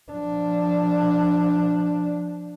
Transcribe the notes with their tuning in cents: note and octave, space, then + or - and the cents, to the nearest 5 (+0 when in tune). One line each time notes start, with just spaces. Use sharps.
F3 +0 D4 +0